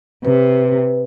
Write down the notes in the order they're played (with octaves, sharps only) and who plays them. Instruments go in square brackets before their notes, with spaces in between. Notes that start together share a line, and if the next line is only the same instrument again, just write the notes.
[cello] C3 [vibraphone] B4